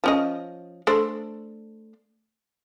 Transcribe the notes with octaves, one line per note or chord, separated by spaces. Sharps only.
F3 C#4 D#5
A3 D4 C5